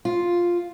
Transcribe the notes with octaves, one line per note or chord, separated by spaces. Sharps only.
F4